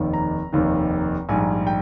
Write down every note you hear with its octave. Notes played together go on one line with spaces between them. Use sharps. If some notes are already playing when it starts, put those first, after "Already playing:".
Already playing: F1 D#2 D#3
A#5
F1 D#2 D#3
A#1 G#2 G3 G#5
G5